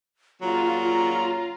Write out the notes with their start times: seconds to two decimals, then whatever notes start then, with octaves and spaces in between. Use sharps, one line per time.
0.42 A#2 C#3 F#3 F4 A#5